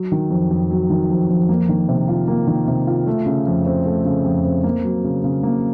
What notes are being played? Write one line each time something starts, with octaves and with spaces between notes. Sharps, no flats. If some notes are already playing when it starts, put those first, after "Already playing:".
Already playing: F#3
D#3
F2
F2
F#3
D#3
F2
F2
A#3
D#3
C3
F4
A#3
D#3
C3
F4
A3
C#3
F2
C4
A3
C#3
F2
C4
A#3
F#3
C#3
C#3
A#3